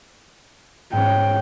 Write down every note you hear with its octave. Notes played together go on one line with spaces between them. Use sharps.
G#2 C#4 G5